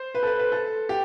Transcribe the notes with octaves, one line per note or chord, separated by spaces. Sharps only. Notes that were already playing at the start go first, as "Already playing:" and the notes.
Already playing: C5
B4
A4
B4
B4
A4
G4